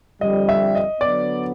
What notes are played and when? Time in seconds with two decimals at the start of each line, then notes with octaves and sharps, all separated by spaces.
0.21 F2 D3 G3 D#5
0.49 E5
0.75 D#5
1.01 D3 F#3 B3 D5